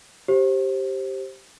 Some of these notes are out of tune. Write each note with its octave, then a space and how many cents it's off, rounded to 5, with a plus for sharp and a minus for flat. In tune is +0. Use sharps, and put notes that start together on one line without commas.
G4 -10 C5 +20